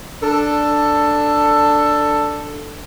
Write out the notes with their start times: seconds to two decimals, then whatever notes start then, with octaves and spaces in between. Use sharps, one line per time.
0.23 D4 A4